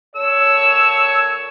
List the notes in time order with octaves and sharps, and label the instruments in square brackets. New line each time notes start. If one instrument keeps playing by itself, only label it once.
[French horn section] A#2 A4 C#5 [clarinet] E6